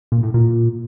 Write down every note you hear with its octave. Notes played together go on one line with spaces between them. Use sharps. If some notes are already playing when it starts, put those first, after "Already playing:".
A#2
A2
A#2